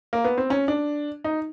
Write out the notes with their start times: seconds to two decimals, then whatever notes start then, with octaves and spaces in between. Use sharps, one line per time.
0.13 A#3
0.24 B3
0.38 C4
0.50 C#4
0.68 D4
1.24 D#4